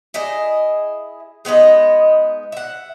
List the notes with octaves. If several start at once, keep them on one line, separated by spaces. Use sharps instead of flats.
E4 G#4 D#5
G#3 B3 D#4 D#5
E5 F#5